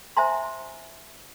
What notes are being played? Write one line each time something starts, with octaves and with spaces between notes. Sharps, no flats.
C5 E5 G#5 A#5 C6